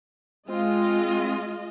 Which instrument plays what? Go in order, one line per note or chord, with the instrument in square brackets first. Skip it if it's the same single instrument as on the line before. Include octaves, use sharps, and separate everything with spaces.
[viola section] G#3 F4 D#5 [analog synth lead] C4